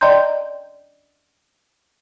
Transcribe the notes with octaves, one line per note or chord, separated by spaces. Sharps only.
D5 D#5 G5 A#5 C6 G6